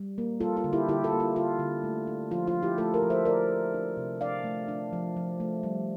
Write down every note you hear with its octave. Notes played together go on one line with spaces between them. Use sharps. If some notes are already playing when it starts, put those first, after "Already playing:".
Already playing: G3
A#3
G3 F4 A4
F4
D3
E4 G4
D3 E4 G4
F4 A4
A#3
F4
D3 F4
D3
A3
D4
F3 F4
F4
F3
E4 G4
A3 F4 A4
G4 A#4
F3
C5 E5
D4 A#4 D5
D4
D4
C3
D4 D5 F5
A3
D4
F3
F3
A3
G3